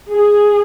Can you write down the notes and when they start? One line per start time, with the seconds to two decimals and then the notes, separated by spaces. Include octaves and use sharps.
0.11 G#4